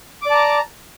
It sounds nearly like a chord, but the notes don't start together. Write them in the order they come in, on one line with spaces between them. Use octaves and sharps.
D6 D5 A5 A#5